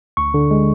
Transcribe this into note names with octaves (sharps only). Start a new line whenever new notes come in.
D2 C#6
D3
G#3